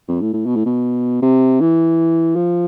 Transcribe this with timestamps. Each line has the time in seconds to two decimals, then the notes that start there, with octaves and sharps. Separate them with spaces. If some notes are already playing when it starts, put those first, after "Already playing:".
0.08 F2
0.22 A2
0.33 A2
0.46 B2
0.56 A2
0.66 B2
1.22 C3
1.60 E3
2.36 F3